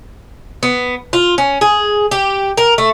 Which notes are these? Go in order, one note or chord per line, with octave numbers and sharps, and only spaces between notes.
B3
F4
C#4
G#4
G4
A#4
A3